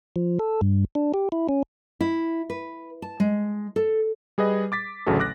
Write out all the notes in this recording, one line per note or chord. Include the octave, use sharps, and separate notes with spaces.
F3
A4
G2
D4
G4
E4
C#4
E4
B4
A5
G#3
A4
G3 G#4 B4 D#5
D6 A6 B6
A1 D2 C#3 F#3 A3 A4
D6 F#6 A#6